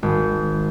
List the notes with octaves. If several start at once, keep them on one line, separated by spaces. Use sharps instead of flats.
G#1